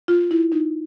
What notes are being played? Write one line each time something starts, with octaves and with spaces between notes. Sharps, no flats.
F4
E4
D#4